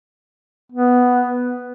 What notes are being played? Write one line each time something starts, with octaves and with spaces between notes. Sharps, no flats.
B3